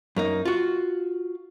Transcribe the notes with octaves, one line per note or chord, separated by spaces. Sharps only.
F#2 A#3 D#4
F4 F#4